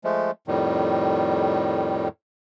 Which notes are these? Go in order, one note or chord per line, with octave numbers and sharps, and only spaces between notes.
F3 G#3 A3
F2 A2 D#3 G3